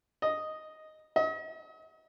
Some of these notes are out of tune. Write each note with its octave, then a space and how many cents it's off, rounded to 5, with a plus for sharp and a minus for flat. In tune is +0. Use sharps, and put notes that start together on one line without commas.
D#5 +0
D#5 +40